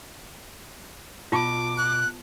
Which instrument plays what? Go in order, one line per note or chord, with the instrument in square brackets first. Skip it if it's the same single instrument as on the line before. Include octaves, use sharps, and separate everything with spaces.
[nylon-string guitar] B2 [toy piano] F4 A5 [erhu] D6
[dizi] F#6